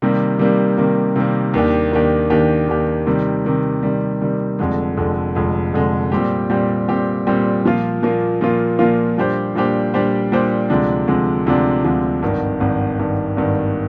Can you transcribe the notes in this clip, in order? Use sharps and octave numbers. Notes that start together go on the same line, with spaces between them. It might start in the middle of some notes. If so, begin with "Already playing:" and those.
C3 D#3 G3 A#3
C3 D#3 G3 A#3
C3 D#3 G3 A#3
C3 D#3 G3 A#3
D#2 D#3 A#3 D4 G4
D#2 D#3 A#3 D4 G4
D#2 D#3 A#3 D4 G4
D#2 D#3 A#3 D4 G4
C3 D#3 G3
C3 D#3 G3
C3 D#3 G3
C3 D#3 G3
F1 F2 D3 G#3
F1 F2 D3 G#3
F1 F2 D3 G#3
F1 F2 D3 G#3
A#2 G3 C4 G4
A#2 G3 C4 G4
A#2 G3 C4 G4
A#2 G3 C4 G4
A#2 F3 A#3 F4
A#2 F3 A#3 F4
A#2 F3 A#3 F4
A#2 F3 A#3 F4
A#2 G3 D4 G4 C5
A#2 G3 D4 G4 C5
A#2 G3 D4 G4 C5
A#2 G3 D4 G4 C5
D2 C3 F3 G#3 D4
D2 C3 F3 G#3 D4
D2 C3 F3 G#3 D4
D2 C3 F3 G#3 D4
G#1 G2 D#3
G#1 G2 D#3
G#1 G2 D#3
G#1 G2 D#3